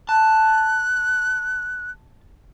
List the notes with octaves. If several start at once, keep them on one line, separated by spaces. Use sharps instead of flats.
A5 F#6